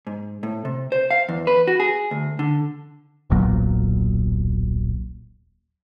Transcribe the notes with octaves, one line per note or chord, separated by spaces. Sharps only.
G#2
A2
C3
C5
F5
E2
B4
F#4
G#4
D2
D3
D#1 B1 A#2 F#3